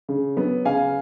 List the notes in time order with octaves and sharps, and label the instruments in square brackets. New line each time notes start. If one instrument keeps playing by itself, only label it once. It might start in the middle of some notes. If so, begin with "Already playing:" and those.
[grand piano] C#3
F#3 B3
C#3 F5 G#5